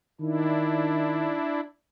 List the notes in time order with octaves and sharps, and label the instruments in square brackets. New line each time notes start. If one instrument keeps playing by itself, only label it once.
[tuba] D#3 [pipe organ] D4 E4